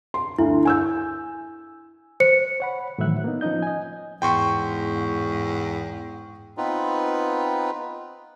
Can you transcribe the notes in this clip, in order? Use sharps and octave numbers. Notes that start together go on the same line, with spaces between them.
C6
D2 E4
G#5 E6 G6
C5 C#7
C#5 F#5 B5
A2 D#3 E3 F#3 E5 F#6
A#3 B3 D#4
F3 C#4 D#4 D#5 G6
D#5 G#5
E2 G#2 G5 C6 C#6
B3 C4 D#4 F4 B4